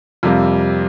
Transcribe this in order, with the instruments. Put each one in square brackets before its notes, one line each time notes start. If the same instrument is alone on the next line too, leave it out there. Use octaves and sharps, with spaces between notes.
[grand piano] F2 C3 G3 A#3